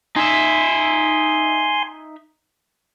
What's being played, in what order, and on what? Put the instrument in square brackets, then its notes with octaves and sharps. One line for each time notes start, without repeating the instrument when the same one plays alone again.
[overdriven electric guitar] D#4 E5 [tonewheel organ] G#5 C6